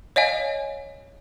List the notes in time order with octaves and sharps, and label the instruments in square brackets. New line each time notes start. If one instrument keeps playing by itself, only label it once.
[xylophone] C#5 D#5 F5 G#5